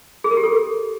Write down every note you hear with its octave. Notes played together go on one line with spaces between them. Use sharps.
G#4
A#4
G4
A4